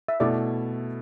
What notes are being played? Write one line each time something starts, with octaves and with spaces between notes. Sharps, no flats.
E5
B2 A3 E4 A4 D5